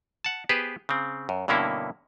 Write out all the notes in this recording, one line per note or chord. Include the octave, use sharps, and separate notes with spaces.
F#5 A5
B3 G4 G#4 B4 C5
C#3 C4
F#2
G2 B2 D3 A#3 C#4 E4